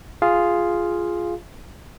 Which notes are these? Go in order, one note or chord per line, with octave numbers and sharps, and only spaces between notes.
F4 G#4 F5